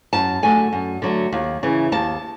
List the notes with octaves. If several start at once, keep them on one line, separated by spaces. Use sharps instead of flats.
F#2 A5
D3 F#3 A3 G#5
F#2
D3 F#3 A3
D#2
C#3 E3
D#2 A5